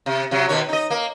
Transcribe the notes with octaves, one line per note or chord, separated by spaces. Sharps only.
C3
C3 F#3
B2 D#3 C#5
D#4 D#5
A#3